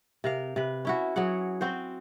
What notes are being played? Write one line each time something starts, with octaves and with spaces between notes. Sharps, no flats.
C3 A#4 F5
C3 B4
C#4 E4 F#4
F#3 F#4 G#4 F#5
C4 F#4 C5